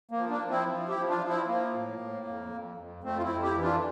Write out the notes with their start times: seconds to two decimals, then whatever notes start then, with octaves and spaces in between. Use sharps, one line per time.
0.11 A#3
0.17 F3
0.30 A#3 D4
0.44 F3
0.50 C4 E4
0.69 F3
0.88 E4 G4
0.96 F3
1.08 D4 F4
1.21 F3
1.28 C4 E4
1.47 F3 A#3
1.73 A2
2.00 A2
2.26 F2
2.52 F2
2.77 F2
3.03 F2 A3 C4
3.17 F4
3.22 C4 E4
3.30 F2
3.42 E4 G4
3.56 E3
3.62 D4 F4